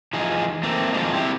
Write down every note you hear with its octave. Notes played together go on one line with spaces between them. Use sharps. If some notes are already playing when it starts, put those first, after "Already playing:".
E3 F3 D#4 G#4
A3 A#3 C4
D#3 F3 G#3 D4 D#4
C4 E4 F#4 G4